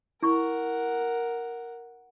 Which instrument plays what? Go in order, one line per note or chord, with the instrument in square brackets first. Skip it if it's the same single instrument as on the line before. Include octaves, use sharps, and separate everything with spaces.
[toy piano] E4 C#6 [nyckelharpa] A#4 F#5